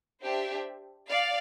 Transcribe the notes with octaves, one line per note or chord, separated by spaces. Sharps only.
D4 G4 C5 E5
D5 F5